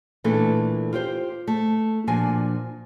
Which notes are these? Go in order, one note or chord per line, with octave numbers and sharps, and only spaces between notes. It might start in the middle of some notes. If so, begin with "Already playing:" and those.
A#2 E3 A3 C#4 D4 A4
F4 G4 C5
A3
A#2 F3 D4 F#4 G#5